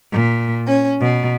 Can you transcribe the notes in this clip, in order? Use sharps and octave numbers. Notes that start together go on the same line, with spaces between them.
A#2
C#4
B2